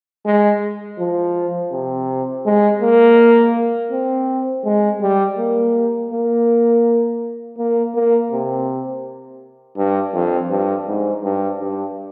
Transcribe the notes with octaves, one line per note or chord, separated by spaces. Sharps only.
G#3
F3
C3
G#3
A#3
C4
G#3
G3
A#3
A#3
A#3
A#3
C3
G2
F2
G2
G#2
G2
G2